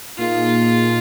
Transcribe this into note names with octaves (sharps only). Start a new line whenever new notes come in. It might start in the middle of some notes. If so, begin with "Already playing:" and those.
A#2 A#3 D#4 F4 G#4 F5